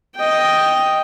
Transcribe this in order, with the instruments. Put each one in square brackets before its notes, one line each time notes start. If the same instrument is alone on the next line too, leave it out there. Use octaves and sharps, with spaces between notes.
[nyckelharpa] D#5 G5